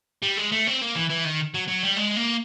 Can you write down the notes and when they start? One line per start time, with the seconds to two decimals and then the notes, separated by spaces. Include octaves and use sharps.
0.23 G3
0.37 G#3
0.52 A3
0.67 C4
0.81 A#3
0.95 E3
1.10 E3
1.25 D#3
1.54 F#3
1.68 F#3
1.83 G3
1.97 G#3
2.17 A#3